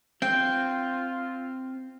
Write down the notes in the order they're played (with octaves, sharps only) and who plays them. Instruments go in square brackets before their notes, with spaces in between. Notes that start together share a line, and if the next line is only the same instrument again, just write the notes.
[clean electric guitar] C4 [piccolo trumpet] F4 [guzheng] G5